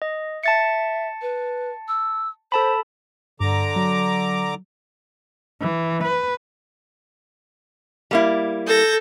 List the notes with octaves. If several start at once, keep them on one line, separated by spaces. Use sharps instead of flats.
D#5
E5 A5 A6 C#7
B4
E6
A4 C5 A5 B5
G2 D3 A#5 D6
F#3
E3
B4
G3 A#3 E4
A4 G6 A#6